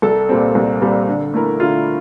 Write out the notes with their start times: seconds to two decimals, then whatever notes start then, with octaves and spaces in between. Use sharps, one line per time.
0.02 C2 A4
0.29 A#2 G3 C4
0.55 C2
0.81 A#2 G3 C4
1.08 D3
1.34 A3 E4 A#4
1.60 D3 F4